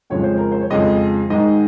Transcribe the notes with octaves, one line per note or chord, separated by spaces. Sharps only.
F2 C#3 F3 G#3 C#5
C5
A#4
C5
C#5
F2 C#3 F3 G#3 D#5
G#2 D#3 G#3 D#5